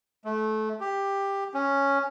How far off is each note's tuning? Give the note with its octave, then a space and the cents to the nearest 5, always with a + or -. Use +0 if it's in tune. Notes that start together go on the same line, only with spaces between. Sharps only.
A3 -25
G4 +10
C#4 +0